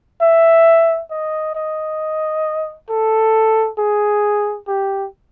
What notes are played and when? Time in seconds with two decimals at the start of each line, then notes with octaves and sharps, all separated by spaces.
0.22 E5
1.11 D#5
1.55 D#5
2.90 A4
3.78 G#4
4.68 G4